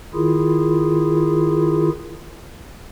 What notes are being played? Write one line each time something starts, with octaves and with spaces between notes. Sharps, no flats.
D#3 E4 F4 G#4